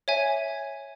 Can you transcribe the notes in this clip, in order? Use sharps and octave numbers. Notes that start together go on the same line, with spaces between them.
C#5 E5 G#5